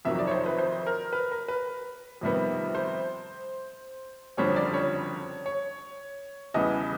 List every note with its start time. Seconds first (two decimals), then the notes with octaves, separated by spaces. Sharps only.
0.05 F2 C3 D#3 F#3 E5
0.19 D5
0.27 C#5
0.31 C5
0.46 B4
0.58 C5
0.87 A#4
1.13 B4
1.32 A#4
1.48 B4
2.21 F2 C3 D#3 G3 B3
2.75 C5
4.37 F#1 F2 D3 G3 C4 C#5
4.56 D5
4.74 C#5
5.46 C#5
6.54 E2 C#3 E3 G3 D#5